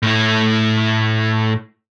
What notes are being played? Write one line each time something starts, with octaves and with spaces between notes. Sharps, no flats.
A2 E4